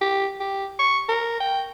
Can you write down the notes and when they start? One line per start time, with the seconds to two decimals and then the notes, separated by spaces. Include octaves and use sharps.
0.01 G4
0.40 G4
0.79 C#6
1.09 A#4
1.40 G5